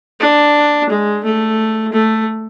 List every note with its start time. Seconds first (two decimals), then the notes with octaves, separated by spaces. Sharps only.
0.20 D4
0.89 G#3
1.24 A3
1.93 A3